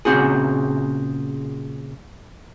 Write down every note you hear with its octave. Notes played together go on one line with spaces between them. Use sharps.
A#2 C#3 B3 C4 F#4 G#4